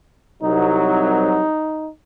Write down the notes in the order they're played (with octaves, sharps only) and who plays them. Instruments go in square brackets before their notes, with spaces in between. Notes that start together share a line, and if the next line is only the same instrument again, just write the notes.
[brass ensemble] C2 F#3 [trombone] D#4